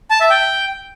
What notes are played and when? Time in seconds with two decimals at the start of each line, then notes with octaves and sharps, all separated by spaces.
0.11 A5
0.20 E5
0.30 G5